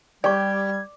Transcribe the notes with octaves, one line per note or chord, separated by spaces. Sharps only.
G3 G4 D5 C#6 G#6